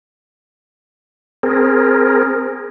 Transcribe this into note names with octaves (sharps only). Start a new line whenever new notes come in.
C4 G#4 A#4